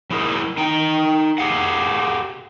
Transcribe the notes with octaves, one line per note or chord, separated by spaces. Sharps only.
F#3 E4 G#4 A#4
D#4 G5
G4 G#4 F5 F#5